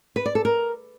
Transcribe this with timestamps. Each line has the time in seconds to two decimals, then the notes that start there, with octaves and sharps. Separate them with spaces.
0.16 B4
0.26 D5
0.35 A4
0.45 A#4